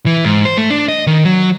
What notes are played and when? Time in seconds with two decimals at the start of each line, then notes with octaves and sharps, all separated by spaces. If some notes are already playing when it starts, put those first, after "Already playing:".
0.06 E3
0.25 G#2
0.45 C5
0.57 A3
0.71 D4
0.88 D#5
1.07 D#3
1.25 F#3